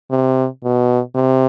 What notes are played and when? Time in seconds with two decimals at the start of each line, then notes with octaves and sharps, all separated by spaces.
0.11 C3
0.64 B2
1.15 C3